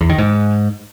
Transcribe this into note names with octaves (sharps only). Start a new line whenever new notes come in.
E2
D#3
G#2